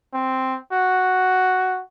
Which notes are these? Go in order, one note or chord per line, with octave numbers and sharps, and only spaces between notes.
C4
F#4